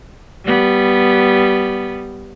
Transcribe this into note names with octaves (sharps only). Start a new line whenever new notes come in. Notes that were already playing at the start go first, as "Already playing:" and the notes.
G3 B3